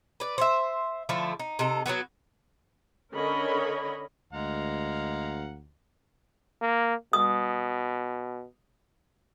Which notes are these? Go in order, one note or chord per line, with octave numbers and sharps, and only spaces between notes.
B4 D5
C5 C#5 E5
D3 F3 A3 E4
D#4
C3 D#4 A4
F#3 G3 B3 F#4
D3 C#4 A#4 C#5 D#5 B5
D2 G#3 F5 F#5 A#5
A#3
B2 D#6